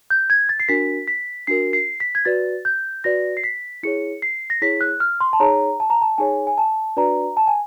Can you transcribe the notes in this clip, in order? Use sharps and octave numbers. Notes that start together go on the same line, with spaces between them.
G6
G#6
A6
C7
D4 F#4 A#4 B6
B6
D4 F#4 A#4 C7
C7
B6
G#6
F#4 B4 D5 A6
G6
F#4 B4 D5 A#6
C7
B6
E4 G#4 C#5 C#7
C7
A#6
E4 G#4 C#5 B6
F#6
F6
C6
A5
D#4 G#4 C#5 A#5
A5
A#5
A5
D#4 G#4 C#5 G#5
G#5
A5
D4 F#4 B4 D5 A#5
A5
G#5